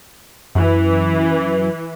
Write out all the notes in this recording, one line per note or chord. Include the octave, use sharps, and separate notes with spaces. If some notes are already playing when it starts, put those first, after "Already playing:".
F#2 E3